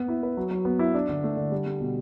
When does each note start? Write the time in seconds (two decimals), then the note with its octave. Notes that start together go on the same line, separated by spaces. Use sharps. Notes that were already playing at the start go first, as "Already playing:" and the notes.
Already playing: B3
0.08 E4
0.23 B4
0.37 F#3
0.51 F#3
0.65 B3
0.79 E4
0.94 D4
1.09 D3
1.24 A3
1.37 D3
1.52 G3
1.66 G3
1.80 B2